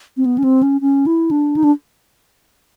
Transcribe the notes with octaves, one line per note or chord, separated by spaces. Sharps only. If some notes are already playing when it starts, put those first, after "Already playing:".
C4
B3
C#4
C4
C#4
C#4
E4
D4
D#4
D4